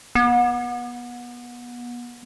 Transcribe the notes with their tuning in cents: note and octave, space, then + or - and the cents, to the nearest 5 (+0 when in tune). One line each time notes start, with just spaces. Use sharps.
B3 -30